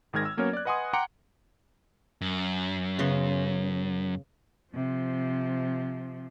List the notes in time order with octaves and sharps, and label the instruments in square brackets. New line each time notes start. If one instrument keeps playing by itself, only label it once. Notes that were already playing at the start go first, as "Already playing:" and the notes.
[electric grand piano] G#1 D#3 G#3 F6 G#6 A#6
E6
F#3 A#3 B3 C#4 A#4 C#5
D5 F#6
B4 D#5 F#5 G#5 C6 D#6
F#5 G5 A#5 C6 D6 C#7
[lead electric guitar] F#2
[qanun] C#3 B3 C6
[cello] C3 F3